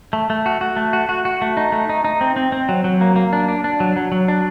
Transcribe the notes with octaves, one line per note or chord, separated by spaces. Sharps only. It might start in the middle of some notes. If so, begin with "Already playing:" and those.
A3
A3
F#4
F#4
A3
F#4
F#4
F#4
A3
D#4
A3
D#4
D#4
C4
C4
C4
F#3
F#3
A#3
A#3
D4
D4
D4
F#3
F#3
F#3
D4